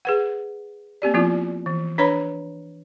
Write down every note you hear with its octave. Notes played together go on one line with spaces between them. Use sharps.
G#4 B4 F#5
A#3 C4 G4 D5
F3 B3 C4 E4 F4
E3
D4 B4 C#5 A#5 B5